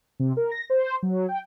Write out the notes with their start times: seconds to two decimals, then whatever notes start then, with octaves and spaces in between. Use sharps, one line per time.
0.20 C3
0.37 A#4
0.51 A#6
0.70 C5
1.03 F#3
1.28 G5